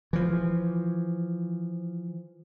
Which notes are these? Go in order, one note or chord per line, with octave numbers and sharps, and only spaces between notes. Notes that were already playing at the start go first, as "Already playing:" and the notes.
E3 F3